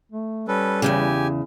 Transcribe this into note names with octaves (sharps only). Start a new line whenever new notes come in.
A3
G3 C#4 A4 B4
E2 G2 C#3 G4 G#5